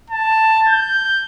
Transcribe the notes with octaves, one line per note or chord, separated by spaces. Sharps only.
A5
G6